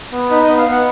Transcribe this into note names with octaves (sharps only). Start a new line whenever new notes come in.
B3
D#4 B4
D#5
B3
F5
B3 F#5